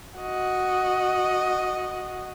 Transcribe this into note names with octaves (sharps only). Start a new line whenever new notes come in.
F#4 D#5